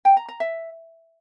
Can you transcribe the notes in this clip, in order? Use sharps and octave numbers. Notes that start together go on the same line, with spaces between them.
G5
A#5
A#5
E5